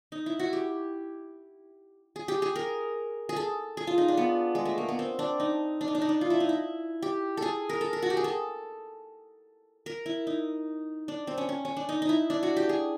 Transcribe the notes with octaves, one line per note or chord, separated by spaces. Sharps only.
D#4
E4
F#4
G4
G#4
G4
G#4
A#4
G#4
A4
G#4
F4
D#4
D4
B3
G#3
A3
A#3
B3
C4
D4
D#4
D4
D#4
D4
D#4
D4
F4
E4
D#4
E4
G4
G#4 A4
A#4
A4
A#4
F#4
G4
G#4
A4
A#4
E4
D#4
D4
C4
C#4
C#4
C#4
D4
D#4
D#4
E4
D4
F#4
G4
G#4